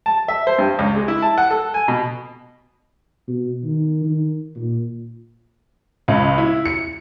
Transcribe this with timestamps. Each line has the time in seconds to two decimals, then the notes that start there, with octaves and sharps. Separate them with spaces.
0.06 A5
0.28 E5
0.47 C5
0.58 G2
0.79 C#2
0.95 G#3
1.08 E4
1.22 A5
1.38 F#5
1.50 A4
1.74 G#5
1.88 B2
3.28 B2
3.65 D#3
4.04 D#3
4.56 A#2
6.08 C#2
6.38 E4
6.66 C#7